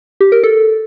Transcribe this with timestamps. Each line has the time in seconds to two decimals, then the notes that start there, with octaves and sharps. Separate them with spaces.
0.21 G4
0.32 A#4
0.43 A4